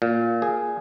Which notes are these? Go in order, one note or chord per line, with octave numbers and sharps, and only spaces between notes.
A#2
G#4